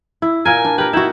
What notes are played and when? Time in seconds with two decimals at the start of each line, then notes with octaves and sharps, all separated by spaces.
0.22 E4
0.45 A#2 A#4 G#5
0.65 D4
0.78 G4 A#4 B4
0.93 D#4 E4 F#4